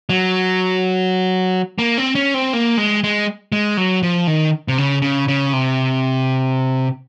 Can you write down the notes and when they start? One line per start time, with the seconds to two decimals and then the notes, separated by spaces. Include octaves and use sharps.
0.09 F#3
1.78 A#3
1.98 C4
2.15 C#4
2.34 C4
2.53 A#3
2.78 G#3
3.04 G#3
3.52 G#3
3.77 F#3
4.03 F3
4.27 D#3
4.68 C3
4.78 C#3
5.02 C#3
5.28 C#3
5.53 C3